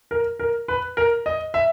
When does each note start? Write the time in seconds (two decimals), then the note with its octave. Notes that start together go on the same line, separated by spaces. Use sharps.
0.11 A#4
0.39 A#4
0.68 B4
0.97 A#4
1.26 D#5
1.54 E5